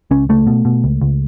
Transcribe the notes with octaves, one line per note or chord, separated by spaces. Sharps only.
C#2 C#4
C#2 A3
B2
B2
C#2
C#2